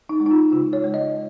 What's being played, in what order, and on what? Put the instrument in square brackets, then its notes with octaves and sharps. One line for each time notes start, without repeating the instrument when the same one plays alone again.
[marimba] D#4
G#3
D#4
F4
C#3 F4
C#5
G#3
D#5